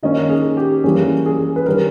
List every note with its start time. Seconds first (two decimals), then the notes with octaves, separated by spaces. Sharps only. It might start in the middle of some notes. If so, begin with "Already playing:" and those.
0.03 D#3 A#3 C#4 D#5
0.29 G#4
0.57 G4
0.84 E3 G3 A#3 C#4 G#4
1.26 G#4
1.56 B4
1.66 D#3 G3 C#4 A#4